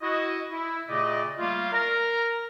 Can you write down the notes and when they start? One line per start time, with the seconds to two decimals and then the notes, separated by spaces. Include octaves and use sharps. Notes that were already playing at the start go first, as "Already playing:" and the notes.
0.01 E4 F#4 D#5
0.51 E4
0.88 A#2 C#3 A3 G4 D5 D#5
1.38 G3 A3 A#3 F4
1.72 A#4 A#5